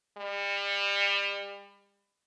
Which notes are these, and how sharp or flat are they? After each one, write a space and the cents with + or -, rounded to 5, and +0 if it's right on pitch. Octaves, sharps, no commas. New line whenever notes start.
G3 +35